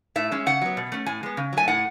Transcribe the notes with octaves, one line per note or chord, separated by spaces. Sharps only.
A2 E5
G#3 C#4
C#3 F#5
F#3 B3
B2
A3 C#4
A2 G#5
G#3 B3
C#3
F#3 A3 G#5
A2 F#5